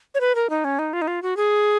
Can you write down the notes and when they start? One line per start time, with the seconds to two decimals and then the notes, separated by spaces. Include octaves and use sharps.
0.15 C#5
0.20 B4
0.35 A#4
0.50 D#4
0.64 C#4
0.79 D#4
0.93 F4
1.02 D#4
1.08 F4
1.22 F#4
1.37 G#4